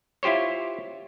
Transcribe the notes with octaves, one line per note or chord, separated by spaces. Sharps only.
E4 F4 G4 C5 C#5